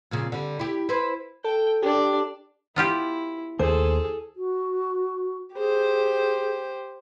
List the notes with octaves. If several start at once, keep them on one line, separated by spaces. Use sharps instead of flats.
F2 A#2 C#3
D3 G3
E4 G4
E4 B4 C5
A4 G5
D4 G4 A4 D5
B3 E4 F4 G4
D#2 A3 G#4 A4 C5
F#4
G4 G#4 C5